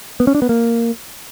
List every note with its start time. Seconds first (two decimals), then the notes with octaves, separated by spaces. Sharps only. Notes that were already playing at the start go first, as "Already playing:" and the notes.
0.20 B3
0.27 C#4
0.35 D4
0.42 B3
0.49 A#3